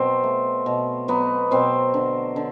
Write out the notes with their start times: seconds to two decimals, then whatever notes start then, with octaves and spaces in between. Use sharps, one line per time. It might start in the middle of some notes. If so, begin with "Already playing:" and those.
Already playing: B2 F#3 C4
0.24 A3
0.66 B2
1.08 F#3 B3
1.51 B2 C4
1.94 D3
2.36 D3